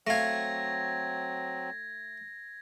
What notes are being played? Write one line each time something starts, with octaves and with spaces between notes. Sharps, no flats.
F#3 A3 C4 F5 G#6 A#6